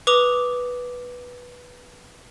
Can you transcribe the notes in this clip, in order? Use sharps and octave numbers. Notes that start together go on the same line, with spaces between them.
B4 D6 D#6 F7